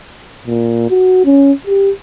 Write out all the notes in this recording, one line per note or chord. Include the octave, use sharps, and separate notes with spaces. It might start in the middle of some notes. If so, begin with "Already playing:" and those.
A#2
F#4
C#4
G4